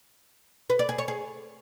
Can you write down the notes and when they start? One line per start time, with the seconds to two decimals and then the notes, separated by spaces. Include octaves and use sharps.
0.70 B4
0.79 D5
0.89 G#4
0.98 C#5
1.08 G#4